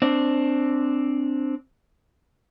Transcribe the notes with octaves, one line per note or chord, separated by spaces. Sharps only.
C4 D4